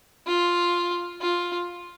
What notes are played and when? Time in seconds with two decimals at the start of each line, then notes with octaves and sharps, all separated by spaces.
0.27 F4
1.21 F4